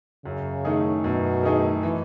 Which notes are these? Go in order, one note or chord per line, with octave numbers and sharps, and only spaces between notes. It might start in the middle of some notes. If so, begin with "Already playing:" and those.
F#2 C#3
D#3 A3 D#4 G#4
F#2 B2
D#3 A3 D#4 G#4
E3